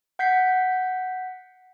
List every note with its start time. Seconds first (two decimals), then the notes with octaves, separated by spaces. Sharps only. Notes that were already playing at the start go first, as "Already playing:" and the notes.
0.19 F#5 G6 B6 C7